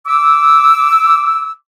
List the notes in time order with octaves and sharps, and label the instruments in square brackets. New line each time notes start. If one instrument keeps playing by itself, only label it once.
[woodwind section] D6 E6